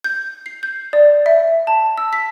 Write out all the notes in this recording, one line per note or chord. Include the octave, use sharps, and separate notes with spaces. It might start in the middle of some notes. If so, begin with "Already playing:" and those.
G6
C7
G6
D5
E5
A5
E6
B6